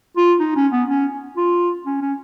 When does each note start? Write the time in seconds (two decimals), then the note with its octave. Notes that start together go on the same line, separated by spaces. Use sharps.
0.17 F4
0.40 D#4
0.56 C#4
0.72 B3
0.89 C#4
1.37 F4
1.86 C#4
2.01 C#4